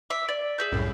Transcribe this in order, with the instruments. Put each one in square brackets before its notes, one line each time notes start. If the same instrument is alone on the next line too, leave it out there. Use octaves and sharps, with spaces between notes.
[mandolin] E5 D6
D5
G#4 E5 G6
[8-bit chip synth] C2 F#2 A2